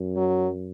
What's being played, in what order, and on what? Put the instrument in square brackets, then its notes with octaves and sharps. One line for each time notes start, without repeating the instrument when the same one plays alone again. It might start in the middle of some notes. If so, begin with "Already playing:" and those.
Already playing: [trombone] F#2
[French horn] F#3